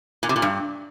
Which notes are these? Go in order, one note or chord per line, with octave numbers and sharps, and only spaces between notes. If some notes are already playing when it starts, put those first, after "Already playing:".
A#2
C3
A#2
G2